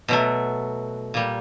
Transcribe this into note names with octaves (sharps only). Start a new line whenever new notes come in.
B2 F#3 A3
A#2 G3